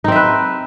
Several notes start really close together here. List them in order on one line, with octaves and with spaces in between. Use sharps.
D#4 C4 E5 B4